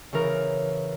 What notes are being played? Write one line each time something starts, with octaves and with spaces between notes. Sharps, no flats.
C#3 E3 A#4